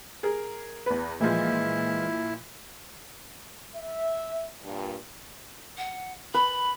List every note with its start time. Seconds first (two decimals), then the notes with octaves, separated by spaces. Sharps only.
0.23 G#4 A#4
0.86 E2 B4
1.20 A#2 E3 F3 G#3 E4
3.75 E5
4.63 G2 A#2
5.78 F#5
6.34 B4 B5